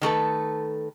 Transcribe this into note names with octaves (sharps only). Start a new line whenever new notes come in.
D#3 A3 A4 B4